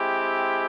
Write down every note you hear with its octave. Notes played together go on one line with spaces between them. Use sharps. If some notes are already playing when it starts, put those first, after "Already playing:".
Already playing: G#3 C4 E4 G4